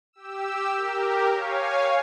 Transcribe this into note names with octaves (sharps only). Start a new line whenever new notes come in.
G4 E6
G4 A#4
C#5 F5 G#5